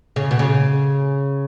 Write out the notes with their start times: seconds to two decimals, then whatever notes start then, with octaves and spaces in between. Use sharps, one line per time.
0.16 C#3
0.31 B2
0.39 C#3